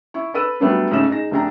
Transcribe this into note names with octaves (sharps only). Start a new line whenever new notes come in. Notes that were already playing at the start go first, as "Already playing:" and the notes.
E4 C#6
A4 B4 B5 E6 D#7
F#3 G3 A3 B3 D4
G#2 C#3 A3 C#4 D#6 E7
D#4 G#4 A#6
F1 A3 D4 G4 A#5